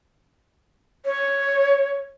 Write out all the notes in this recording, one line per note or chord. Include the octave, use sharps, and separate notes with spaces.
C#5